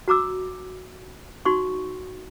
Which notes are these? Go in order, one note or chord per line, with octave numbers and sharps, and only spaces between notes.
F#4 A#5 D6 E6
D#4 F#4 C6 C#6